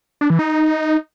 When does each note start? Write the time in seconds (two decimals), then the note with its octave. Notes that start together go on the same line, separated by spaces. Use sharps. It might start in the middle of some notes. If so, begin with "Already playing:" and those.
0.21 D4
0.30 E3
0.39 D#4